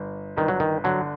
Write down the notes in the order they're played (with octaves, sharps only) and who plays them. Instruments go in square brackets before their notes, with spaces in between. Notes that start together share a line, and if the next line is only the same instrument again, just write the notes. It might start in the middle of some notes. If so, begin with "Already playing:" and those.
Already playing: [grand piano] G1
[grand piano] G1 [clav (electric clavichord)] D#3
[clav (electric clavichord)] F#3
D#3
[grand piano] D3 [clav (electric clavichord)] F#3